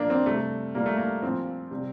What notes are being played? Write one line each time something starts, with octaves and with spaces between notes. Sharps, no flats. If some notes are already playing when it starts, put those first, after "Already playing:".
Already playing: A#2 F3 A#3 D4
C4
C3 G3 A3
A#2 G3 A#3
A3
A#3
A#2 F3 C4
C3 G3